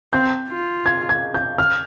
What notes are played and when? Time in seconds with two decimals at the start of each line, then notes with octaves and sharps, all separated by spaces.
0.13 C4 G6
0.49 F4
0.86 G#6
1.09 G#6
1.34 G6
1.58 F6